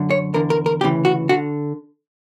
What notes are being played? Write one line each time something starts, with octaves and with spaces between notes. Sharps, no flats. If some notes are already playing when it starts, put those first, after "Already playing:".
Already playing: F#2 D3
C#5
E2 D3 A#4
A#4
A#4
D2 C#3 E3 G4
F#4
D3 F#4